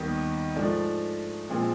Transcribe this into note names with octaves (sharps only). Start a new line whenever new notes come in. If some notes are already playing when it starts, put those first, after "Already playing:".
Already playing: D#2 D#3 G3 B3 D#4
G#2 F3 A3 D4
A#2 F3 G#3 C4